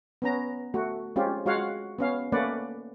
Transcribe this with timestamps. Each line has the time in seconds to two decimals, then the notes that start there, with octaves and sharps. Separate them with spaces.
0.22 B3 C#4 A#5
0.74 A3 F#4
1.16 G#3 C4 C#4 F4 G4
1.46 G#3 F4 F#4 C#5 F5 F#5
1.99 B3 C#4 F5
2.32 A3 A#3 C#4 B4 D5 F#5